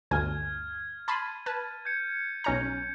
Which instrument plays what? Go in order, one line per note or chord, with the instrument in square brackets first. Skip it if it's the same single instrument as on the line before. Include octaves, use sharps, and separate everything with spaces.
[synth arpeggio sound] G1 D2 G#5 [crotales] F6 G#6
[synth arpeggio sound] A5 B5 C6 [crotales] A6 D#7
[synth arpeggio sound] B4 A5
[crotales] G6 G#6 C#7
[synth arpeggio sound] B1 C#4 A#5